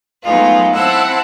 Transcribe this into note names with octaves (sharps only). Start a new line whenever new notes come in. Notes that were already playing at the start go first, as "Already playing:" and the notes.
F#3 G#3 A3 B3 D#4 F4
C4 E4 F#5 A5 E6